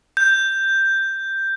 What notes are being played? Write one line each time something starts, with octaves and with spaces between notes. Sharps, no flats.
G6